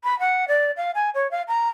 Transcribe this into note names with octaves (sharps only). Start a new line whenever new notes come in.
B5
F#5
D5
F5
G#5
C#5
F5
A#5